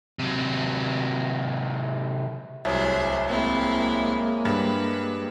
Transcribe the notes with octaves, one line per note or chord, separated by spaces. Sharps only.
C3 F#3
D1 C2 G#4 C5 C#5 E5
G#3 A#3 C4 E4
G2 B4